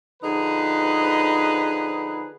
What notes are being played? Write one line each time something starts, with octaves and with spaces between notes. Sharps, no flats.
D3 F3 D#4 G#4 B4